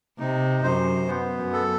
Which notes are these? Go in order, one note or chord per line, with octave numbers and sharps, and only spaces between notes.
C3 D#4
F#2 C5
B3
F#2
A4